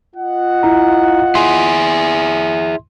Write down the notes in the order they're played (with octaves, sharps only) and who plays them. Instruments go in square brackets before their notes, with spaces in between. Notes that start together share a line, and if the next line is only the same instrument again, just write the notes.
[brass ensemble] F4 D#5 F#5
[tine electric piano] E4 A#5
[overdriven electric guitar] E4 G#4 [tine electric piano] C6